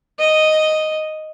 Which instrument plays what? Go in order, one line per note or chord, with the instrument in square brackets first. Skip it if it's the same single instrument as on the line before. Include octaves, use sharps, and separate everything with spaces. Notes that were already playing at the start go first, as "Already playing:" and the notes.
[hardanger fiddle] D#5